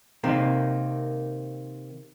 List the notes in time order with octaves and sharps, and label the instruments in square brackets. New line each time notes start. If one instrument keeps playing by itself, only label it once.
[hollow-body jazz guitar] C3 D#3 A#3